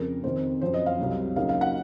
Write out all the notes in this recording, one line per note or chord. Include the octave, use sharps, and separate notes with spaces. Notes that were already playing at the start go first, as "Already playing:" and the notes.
Already playing: F2 C#3 F3 A#4
F2 C3 D#3 C5
F#2 F3 C4 C5
D#5
F5
C2 C3 F#3
D#2 C#3 F#3 A#3 D#4 F5
F5
F#5